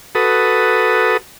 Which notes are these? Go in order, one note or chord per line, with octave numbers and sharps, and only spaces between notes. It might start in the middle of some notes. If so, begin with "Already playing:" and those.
F#4 A4 B4 D#6